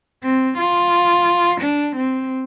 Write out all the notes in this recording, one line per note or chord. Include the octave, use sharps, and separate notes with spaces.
C4
F4
D4
C4